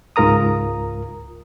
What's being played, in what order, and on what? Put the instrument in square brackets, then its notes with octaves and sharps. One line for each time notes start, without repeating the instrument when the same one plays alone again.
[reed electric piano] C#2 G#2 F4 A#4 A#5 D#6